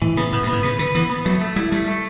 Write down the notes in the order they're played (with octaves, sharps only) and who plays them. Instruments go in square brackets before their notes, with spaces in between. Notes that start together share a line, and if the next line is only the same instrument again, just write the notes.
[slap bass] A2 [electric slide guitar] E3
[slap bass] C#3 [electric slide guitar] B3
[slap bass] A2 [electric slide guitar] B3
[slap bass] G2
[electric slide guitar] B3
[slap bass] A2
[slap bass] C#3 [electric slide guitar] B4
[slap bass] D3 [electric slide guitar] B4
[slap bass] E3 [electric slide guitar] B3
[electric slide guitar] B3
[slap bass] F#3 [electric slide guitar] A3
[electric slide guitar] A3
[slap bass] G3 [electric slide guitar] E4
[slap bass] G3 [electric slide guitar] A3
[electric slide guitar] A3